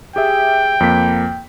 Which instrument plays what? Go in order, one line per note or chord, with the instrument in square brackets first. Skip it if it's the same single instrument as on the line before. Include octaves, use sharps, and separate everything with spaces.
[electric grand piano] G4 G#4 E5 [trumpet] G5
[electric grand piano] F2 A#3 B6